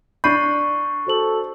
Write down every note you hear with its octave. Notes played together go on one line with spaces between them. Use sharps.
D4 B5 C#6 G6 C7 D#7
F#4 A4 C5 F#7